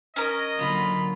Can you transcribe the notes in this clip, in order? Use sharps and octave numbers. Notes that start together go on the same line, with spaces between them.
C#4 A#4 D#5
D3 F#3 A#3 F4 B5